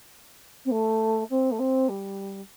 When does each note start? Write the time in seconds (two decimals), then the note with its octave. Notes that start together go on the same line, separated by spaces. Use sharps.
0.65 C4
0.71 A3
1.30 C4
1.51 A3
1.59 C4
1.89 G3